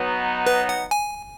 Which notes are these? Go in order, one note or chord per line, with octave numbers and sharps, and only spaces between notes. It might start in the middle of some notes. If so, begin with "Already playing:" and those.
Already playing: F#3 B3 D#4
B4
F#5
G#5